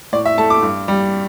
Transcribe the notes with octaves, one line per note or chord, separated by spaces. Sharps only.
A2 D5
E5
A3 A5
D6
G2
G3